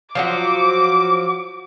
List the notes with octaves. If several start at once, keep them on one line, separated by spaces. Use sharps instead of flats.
F3 F#3 F#4 D6